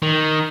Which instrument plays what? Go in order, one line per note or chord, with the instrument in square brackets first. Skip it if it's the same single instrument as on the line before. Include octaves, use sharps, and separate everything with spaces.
[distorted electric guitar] D#3